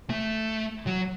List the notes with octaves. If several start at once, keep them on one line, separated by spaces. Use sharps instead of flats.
A3
F#3